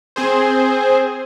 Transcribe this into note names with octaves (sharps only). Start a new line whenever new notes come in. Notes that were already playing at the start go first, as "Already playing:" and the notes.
C4 G#4 C5